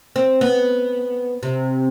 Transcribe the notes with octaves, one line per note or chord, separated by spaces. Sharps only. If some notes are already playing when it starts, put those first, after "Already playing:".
C4
B3
C3